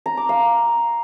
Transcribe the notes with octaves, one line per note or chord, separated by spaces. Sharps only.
A#5
D6
F5